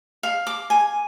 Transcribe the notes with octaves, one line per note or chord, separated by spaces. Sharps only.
F5
D6
G#5